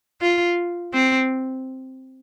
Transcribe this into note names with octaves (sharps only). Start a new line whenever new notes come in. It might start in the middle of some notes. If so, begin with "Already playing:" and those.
F4
C4